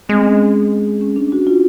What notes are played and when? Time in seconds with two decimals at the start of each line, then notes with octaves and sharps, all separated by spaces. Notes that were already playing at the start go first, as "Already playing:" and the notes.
0.09 G#3 C4
0.24 C#4
1.01 C#4
1.16 D4
1.32 F#4
1.47 F4